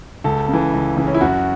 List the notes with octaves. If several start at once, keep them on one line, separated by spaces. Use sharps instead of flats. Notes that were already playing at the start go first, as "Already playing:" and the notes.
C#2 A4
C#3
E3
C#2
C#3 E3
C#4
E4
F#2 F#4